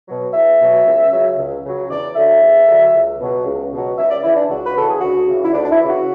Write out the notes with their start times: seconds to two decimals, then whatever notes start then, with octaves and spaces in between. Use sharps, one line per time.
0.08 B2 F#3
0.33 E2 E5
0.60 B2 F#3
0.86 C#2
1.12 C#3 F#3
1.37 C#2
1.64 C#3 F#3
1.90 E2 D5
2.16 D3 F#3 E5
2.42 E2
2.68 D3 F#3
2.94 C#2
3.20 B2 F#3
3.45 C#2
3.72 B2 F#3
3.98 C#2 E5
4.10 D5
4.24 C#3 E3 E4
4.37 D4
4.49 C#2 F#4
4.66 B4
4.76 C#3 E3 A4
4.90 G#4
5.01 D2 F#4
5.28 C#3 E3
5.44 E4
5.53 D2 D4
5.64 D4
5.71 E4
5.80 C#3 E3
5.89 F#4